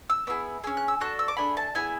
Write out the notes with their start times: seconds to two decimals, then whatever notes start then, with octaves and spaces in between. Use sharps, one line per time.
0.10 E6
0.27 B3 E4 G#4 E6
0.64 C#4 G#4 E6
0.77 F#6
0.88 E6
1.00 D4 F#4 A4 F#6
1.19 E6
1.28 D6
1.37 A3 D4 G#4 B5
1.57 A5
1.75 B3 E4 G#4 G#5